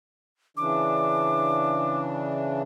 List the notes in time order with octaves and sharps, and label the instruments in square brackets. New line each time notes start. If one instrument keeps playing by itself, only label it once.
[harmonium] C#3 E3 D4 [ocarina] D6